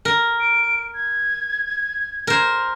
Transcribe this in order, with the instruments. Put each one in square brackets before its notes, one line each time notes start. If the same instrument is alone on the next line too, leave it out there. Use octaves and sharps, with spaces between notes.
[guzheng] A#4
[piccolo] D7
G#6
[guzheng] A#4 C5